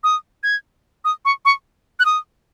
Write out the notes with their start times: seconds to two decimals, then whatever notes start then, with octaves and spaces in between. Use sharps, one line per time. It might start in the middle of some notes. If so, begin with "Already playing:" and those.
0.04 D#6
0.43 G#6
1.05 D#6
1.25 C#6
1.45 C#6
1.99 F#6
2.05 D#6